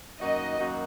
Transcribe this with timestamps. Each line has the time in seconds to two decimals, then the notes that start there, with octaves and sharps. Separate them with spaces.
0.20 F#2 D#3 A#3 D#4 F#4 D#5
0.58 F#2 D#3 A#3 D#4 F#4